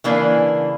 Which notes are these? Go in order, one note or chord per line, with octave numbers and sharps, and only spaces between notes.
C#3 E3 A#3 D4